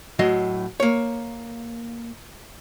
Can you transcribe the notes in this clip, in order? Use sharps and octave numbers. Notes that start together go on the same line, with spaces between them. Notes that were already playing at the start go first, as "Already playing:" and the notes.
A2 F#3 D#5
A#3 C#5